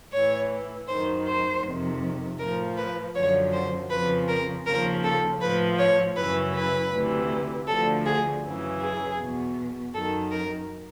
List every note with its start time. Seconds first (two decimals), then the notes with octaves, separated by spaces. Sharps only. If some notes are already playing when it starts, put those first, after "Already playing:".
0.13 A2 E3 C#5
0.88 F#2 D#3 C5
1.26 C5
1.63 F2 C3 D#3
2.39 A2 F3 A#4
2.77 B4
3.14 F#2 D3 F3 C#5
3.53 C5
3.90 F2 C#3 F3 B4
4.28 A#4
4.66 D#2 C#3 F3 A#4
5.04 A4
5.41 A2 F3 B4
5.78 C#5
6.16 F#2 C#3 E3 B4
6.55 B4
6.92 D2 C3 E3
7.67 D2 D3 F3 A4
8.05 G#4
8.43 F#2 C#3 E3
8.81 G#4
9.19 E2 B2
9.94 F#2 D#3 A4
10.31 A#4